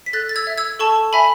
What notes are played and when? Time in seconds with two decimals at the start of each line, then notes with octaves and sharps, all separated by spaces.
0.06 B6
0.13 A4 F#6 A6
0.29 A6
0.36 E6 G#6
0.47 E5
0.58 E6 G#6
0.79 A4 A5 C#6
1.13 E5 G#5 B5